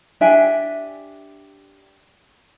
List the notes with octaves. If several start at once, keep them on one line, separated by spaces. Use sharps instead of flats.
D4 G4 E5 G#5